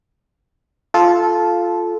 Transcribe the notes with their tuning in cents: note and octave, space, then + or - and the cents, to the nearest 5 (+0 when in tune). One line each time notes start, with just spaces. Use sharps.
F4 +0 A4 -15